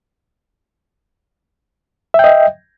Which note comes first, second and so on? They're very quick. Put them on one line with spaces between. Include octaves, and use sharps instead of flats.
E5 G5 D#5